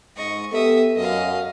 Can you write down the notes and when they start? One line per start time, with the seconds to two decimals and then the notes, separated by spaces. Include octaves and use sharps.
0.17 G#2 D#5 C#6
0.52 B3 G4 A4 E5 D#6
0.96 F#2 D#5 F5